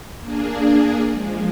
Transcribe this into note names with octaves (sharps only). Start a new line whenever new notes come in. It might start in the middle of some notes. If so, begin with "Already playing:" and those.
A#3 D4 G#4
F3 G#3